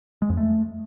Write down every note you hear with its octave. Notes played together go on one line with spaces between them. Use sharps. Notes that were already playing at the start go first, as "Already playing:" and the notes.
G#3
F2
A3